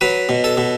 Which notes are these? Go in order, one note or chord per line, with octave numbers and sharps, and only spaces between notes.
F#3 B4
B2
A4
B2